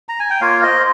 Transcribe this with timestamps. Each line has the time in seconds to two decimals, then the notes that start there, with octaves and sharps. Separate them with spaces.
0.09 A#5
0.19 G#5
0.30 G5
0.41 A#3 F4 C#5 F5
0.62 C5 D#5